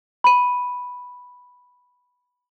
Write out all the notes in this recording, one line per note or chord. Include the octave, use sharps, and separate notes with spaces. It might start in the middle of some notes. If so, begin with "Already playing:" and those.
B5 D#7